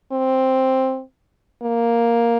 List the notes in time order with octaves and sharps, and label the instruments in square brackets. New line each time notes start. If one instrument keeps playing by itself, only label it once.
[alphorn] C4
A#3